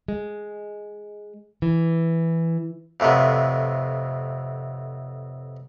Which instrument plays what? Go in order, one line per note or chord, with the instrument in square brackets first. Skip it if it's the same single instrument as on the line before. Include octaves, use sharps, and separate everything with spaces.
[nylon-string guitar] G#3
E3
[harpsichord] F2 A2 C3 B3